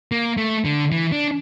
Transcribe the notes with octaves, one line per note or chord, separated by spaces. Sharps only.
A#3
A3
D3
E3
D4